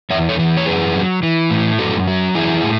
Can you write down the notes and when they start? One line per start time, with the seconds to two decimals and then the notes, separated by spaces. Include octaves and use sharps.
0.10 E2 C#5 E5
0.29 A4 C#5
0.39 E3
0.57 C#5
0.66 F#2 G#4 B4
0.96 F#3
1.23 E3
1.51 A2
1.79 F#2 F#4 A4
2.08 F#3
2.35 E3 E4 G#4
2.63 A2